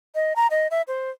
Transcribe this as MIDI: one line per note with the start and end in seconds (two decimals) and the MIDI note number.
0.15 0.33 75
0.36 0.47 82
0.51 0.67 75
0.71 0.82 76
0.88 1.10 72